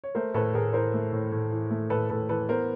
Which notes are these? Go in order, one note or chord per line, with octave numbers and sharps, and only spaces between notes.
C#5
A3 A#4 C5
A2 A4 B4
A2 G#4 A#4
E3 A#4 C5
A3
A2
A2
E3
A3
A2 A4 B4
A2 A4 B4
E3 A4 B4
B3 A#4 C5